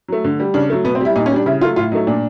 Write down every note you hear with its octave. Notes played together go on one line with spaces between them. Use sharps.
F#3 A3
D3
G3
C#3 D4
F#3 A3
B2 B3
C4
G3 E4
A#2 D#4
C#4
G3 D4
C#3 E4
F#3 A3 F4
A2 F4
F#3 A3 D#4
A#2 D4